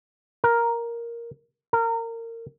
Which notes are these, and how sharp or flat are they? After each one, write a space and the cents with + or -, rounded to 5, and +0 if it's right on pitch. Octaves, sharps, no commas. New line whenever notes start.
A#4 +5
A#4 -25